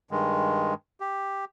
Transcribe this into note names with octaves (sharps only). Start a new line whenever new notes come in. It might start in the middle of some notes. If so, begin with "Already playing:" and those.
G2 D#3 G#3
G4